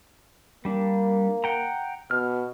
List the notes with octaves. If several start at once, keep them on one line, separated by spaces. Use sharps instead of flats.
G3 A#3 D4
F#5 G5 A#5
B2 F6